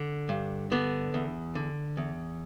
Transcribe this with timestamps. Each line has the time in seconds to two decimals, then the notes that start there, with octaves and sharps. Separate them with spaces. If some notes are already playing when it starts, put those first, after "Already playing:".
Already playing: D3
0.29 G2
0.72 D3 B3
1.14 E2
1.55 D3
1.97 E2